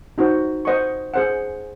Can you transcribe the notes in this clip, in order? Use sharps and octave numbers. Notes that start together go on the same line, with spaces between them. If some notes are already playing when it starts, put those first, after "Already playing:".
D#4 F#4 C5
C5 D#5 F#5 C#6
G#4 C5 F#5